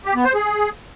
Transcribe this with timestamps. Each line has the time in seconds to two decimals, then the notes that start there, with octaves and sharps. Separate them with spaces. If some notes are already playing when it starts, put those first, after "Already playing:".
0.05 G4
0.15 B3
0.25 C5
0.35 G#4